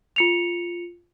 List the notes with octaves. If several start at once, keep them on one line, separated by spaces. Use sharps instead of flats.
F4 C#7 F7